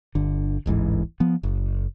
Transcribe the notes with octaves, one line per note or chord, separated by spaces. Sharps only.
G1 D3
D1 A1 G#2 E3
F3 B3
F#1